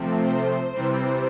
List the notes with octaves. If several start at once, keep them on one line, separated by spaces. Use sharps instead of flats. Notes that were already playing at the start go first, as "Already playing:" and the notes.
Already playing: C3 F3 A3 C4
C5
C3 E3 G3 C4